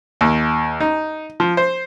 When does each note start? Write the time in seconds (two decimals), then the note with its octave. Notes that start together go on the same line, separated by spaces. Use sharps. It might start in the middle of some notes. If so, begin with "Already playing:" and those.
0.21 D#2
0.80 D#4
1.40 F3
1.57 C5